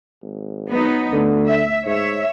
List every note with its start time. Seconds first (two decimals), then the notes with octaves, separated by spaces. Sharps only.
0.23 G#1
0.71 F#3 B3 D#4
1.13 D2 D3
1.47 E5
1.86 G#2 C#5 E5